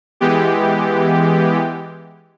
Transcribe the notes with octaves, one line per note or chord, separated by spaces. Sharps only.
E3 G#3 B3 G4